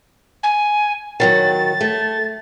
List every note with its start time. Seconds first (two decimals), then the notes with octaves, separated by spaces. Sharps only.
0.43 G#5
1.20 D#3 F3 F#3 A6
1.81 A3